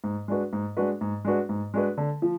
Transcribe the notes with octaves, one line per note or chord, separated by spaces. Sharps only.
G#2
G#3 D4 F#4 B4
G#2
G#3 D4 F#4 B4
G#2
G#3 D4 F#4 B4
G#2
G#3 D4 F#4 B4
D3
F3